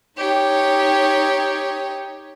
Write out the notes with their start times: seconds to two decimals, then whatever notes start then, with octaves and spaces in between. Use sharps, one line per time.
0.18 D#4 G4 C#5